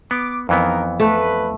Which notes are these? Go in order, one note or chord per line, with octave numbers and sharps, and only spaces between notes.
B3 D6
F2 E3 B3 D#4 A#4
A3 B4